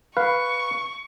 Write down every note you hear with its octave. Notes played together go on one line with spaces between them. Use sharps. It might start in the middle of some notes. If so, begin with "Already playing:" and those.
B4 F5 C#6